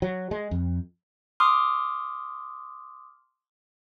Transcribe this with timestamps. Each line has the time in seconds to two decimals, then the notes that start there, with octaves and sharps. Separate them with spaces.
0.02 F#3
0.31 G#3
0.51 F2
1.40 C6 D6 D#6 F6